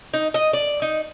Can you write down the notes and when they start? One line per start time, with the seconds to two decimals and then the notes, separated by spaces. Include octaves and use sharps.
0.14 D#4
0.34 D#5
0.53 D5
0.82 D#4